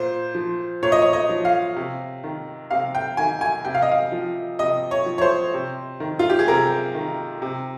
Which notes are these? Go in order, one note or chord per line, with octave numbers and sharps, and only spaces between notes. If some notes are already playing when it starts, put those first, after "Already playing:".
Already playing: A#2 C5
F3
A#2 C#5
D#5
C#5
D#5
F3
F5
C3
D#3
C3 F5
G5
D#3 G#5
G#5
C3 G5
F5
D#5
F5
F3
C3 D#5
C#5
F3
C#5
C5
C3
D#3
F4
G4
G#4
C3 A#4
D#3
C3